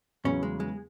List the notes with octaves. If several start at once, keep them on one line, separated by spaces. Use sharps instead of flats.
E2 C#3 F#3 B3 C#4
G#3
G#3